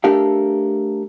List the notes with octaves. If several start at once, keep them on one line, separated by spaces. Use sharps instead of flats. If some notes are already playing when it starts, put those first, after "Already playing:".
A3 D4 G4 A4 A#4 F5